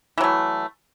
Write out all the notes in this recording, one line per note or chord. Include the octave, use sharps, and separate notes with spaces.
E3 F#3 A3